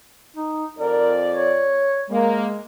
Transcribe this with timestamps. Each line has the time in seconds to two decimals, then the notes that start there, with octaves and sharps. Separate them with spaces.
0.37 D#4
0.79 F2 A#4 D5
1.32 C#5
2.10 G#3 A#3